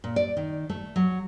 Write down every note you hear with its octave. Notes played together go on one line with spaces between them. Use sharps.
A#2
D5
D#3
A3
F#3